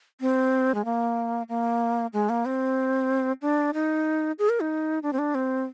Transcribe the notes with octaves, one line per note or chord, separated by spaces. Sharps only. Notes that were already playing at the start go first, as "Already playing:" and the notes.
C4
G#3
A#3
A#3
G#3
A#3
C4
D4
D#4
G#4
A#4
D#4
D4
C4
D4
C4